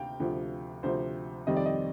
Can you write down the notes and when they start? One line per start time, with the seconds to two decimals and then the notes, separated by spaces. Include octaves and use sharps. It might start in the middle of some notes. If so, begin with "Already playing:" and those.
Already playing: D2 C3 F5 G5
0.20 D2 C3 F3
0.83 D2 C3 F3 C5
1.47 F2 C3 D#3 G3 C4 D#5
1.56 D5
1.65 D#5